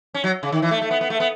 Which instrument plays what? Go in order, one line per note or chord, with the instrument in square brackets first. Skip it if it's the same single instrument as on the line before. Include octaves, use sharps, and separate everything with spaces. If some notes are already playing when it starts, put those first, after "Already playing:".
[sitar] C#4
F#3
C#3
D#3
E3
A3
A3
B3
B3
A3
B3